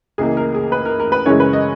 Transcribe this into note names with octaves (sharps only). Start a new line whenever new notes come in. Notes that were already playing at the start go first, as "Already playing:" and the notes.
C#2 C#3 E3 A#3 G#4
A#4
G#4
B4
A#4
A#4
B4
F#2 C#3 E3 G#3 C#5
B4
D#5